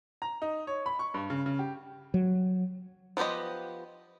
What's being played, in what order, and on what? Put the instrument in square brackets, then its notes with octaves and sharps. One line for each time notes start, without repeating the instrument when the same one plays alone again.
[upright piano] A#5
D#4
C#5
B5
C#6
G2
C#3
C#3
G4
[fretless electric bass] F#3
[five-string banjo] F3 B3 G4 C5 D#5